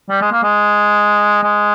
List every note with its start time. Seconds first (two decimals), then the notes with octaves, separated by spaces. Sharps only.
0.10 G3
0.21 G#3
0.32 A#3
0.43 G#3
1.43 G#3